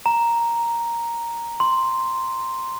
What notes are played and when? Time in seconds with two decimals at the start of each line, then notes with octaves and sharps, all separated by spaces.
0.06 A#5
1.60 C6